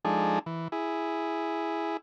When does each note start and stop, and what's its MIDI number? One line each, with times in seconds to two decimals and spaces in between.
0.05 0.39 53
0.05 0.39 56
0.05 0.39 62
0.05 0.39 63
0.05 0.39 68
0.05 0.39 69
0.46 0.68 52
0.72 1.97 64
0.72 1.97 68